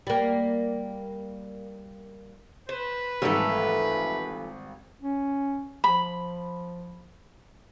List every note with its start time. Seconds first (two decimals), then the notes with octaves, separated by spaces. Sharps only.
0.07 G3 A#3
2.69 B4 C5
3.22 G#1 E3 F3 G3 A3 A4 A#4
5.02 C#4
5.84 F3 B5